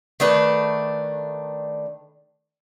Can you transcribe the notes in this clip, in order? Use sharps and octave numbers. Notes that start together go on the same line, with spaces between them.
D#3 A3 D4 B4